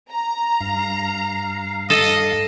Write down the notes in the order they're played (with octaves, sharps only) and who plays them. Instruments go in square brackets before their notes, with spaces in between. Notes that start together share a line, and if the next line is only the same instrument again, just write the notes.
[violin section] A#5
[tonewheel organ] G2 F5
[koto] A4 [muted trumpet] D#5